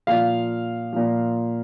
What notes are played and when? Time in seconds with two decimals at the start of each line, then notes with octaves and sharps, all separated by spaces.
0.07 A#2 F3 F5
0.93 A#2 F3